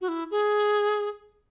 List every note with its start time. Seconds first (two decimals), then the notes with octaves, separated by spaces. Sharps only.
0.01 F#4
0.08 E4
0.31 G#4